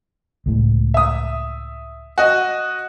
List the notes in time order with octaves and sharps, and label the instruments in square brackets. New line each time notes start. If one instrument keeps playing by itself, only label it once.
[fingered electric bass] C#2 A2
[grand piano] E5 D#6
F#4 D#5